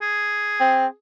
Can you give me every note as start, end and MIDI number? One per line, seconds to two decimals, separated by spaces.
0.02 0.93 68
0.60 0.87 60